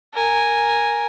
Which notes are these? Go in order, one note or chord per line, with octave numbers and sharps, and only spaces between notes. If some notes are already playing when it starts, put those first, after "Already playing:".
A#4 G#5